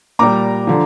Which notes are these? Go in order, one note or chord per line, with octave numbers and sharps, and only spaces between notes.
A#2 G3 A#5 D6
D3 F3